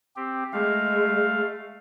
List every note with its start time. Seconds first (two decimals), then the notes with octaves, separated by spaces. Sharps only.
0.16 C4 G4
0.53 G#3 A3 F5